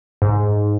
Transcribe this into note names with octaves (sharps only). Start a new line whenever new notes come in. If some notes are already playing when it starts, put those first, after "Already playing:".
G#2